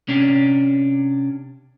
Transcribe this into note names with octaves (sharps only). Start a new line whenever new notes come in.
C3 C#4 D4